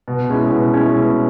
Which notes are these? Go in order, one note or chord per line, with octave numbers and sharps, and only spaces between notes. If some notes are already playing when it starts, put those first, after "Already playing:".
B2
G#3 C#4 E4
B2
G#3 C#4 E4
B2